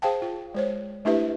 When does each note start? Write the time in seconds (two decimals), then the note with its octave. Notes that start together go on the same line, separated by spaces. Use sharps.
0.02 G#4 C5 F5 G5 A5
0.22 F4
0.54 G#3 C5 C#5
1.05 A3 D4 E4 G4 B4 E5